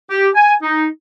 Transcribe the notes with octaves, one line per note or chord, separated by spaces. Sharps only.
G4
G#5
D#4